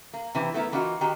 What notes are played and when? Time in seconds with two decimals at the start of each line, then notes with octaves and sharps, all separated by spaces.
0.13 A#3
0.35 C3 E3 C4
0.54 A3 B3 E4 A#4
0.72 E3 A#3 D#4 F4 F#4
1.01 D#3 D#4 F#4 G4